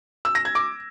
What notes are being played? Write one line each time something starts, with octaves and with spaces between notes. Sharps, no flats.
E6
A#6
G#6
D6